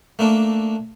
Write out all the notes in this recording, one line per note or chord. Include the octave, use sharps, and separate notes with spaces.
A3 A#3 D4